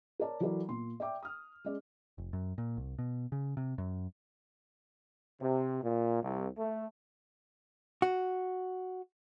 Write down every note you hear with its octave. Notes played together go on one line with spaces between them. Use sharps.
A#4 C#5 D5 A5
E3 F#3 F#4 A4 A#4 D5
A#2 C6
D5 E5 G5 D6
D#6 F6
G#3 C#4 D5
F1
F#2
A#2
C2
B2
C#3
C3
F#2
C3
A#2
C2
A3
F#4